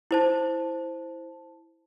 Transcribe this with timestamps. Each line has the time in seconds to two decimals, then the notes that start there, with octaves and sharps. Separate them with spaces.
0.11 E4 C5 A5